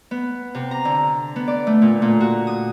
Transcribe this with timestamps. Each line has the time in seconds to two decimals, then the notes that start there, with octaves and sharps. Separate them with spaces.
0.11 B3
0.55 C3
0.71 A#5
0.85 D3
1.36 B3
1.48 D5
1.67 A3
1.82 A#2
2.02 A#2
2.21 F#4
2.47 D#6